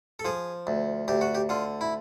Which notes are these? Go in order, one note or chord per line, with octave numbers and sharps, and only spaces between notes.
A4
F3 G#4
D2
D2 G4
F#4
G4
D3 F4
E4